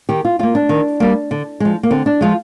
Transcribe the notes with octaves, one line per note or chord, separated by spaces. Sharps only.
D#3 G4
F4
G3 A#3 F4
D4
D#3
G3 A#3
D3
F3 G#3
A#3
D3 C4
D4
F3 G#3 F4